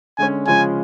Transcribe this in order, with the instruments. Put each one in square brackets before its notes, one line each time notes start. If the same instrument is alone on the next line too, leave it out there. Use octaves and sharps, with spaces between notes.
[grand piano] D3 G#3 C#4 [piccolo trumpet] G#5
[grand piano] C#3 F3 G#3 C#4 [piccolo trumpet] G#5